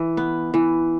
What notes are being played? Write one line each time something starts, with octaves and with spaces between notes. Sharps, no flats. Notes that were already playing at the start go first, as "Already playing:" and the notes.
Already playing: E3
B3
E3